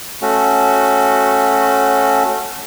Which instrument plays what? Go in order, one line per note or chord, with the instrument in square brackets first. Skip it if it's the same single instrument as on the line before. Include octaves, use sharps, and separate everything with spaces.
[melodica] A3 C#4 F#4